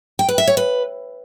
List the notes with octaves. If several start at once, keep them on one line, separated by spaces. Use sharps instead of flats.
G5
B4
E5
C#5
B4